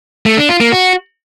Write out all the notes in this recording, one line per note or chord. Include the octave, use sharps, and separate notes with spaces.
A3
D4
F4
A#3
F#4